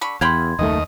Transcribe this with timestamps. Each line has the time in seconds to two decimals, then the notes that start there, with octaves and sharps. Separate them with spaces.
0.01 D3 B5 C#6
0.21 E2 F5 G5 B5 C6 G#6
0.59 F#1 D#2 D#3 A3 D#5